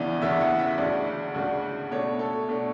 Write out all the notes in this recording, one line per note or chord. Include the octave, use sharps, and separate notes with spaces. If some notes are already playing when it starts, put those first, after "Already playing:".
Already playing: E2 C#3 E3 B3 D4 D5
E2 C#3 E3 B3 D4 E5
F#5
E5
D2 C#3 G#3 D4 D5
D2 C#3 G#3 D4
B2 A3 D4 C#5
A4
B2 A3 D4